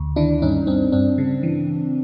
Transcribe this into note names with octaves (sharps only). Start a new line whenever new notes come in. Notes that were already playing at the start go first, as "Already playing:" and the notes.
Already playing: D2
D#3 D4 E4
G2 C#4 D#4
G2 C4 D4
G2 C4 D4
C#3
E3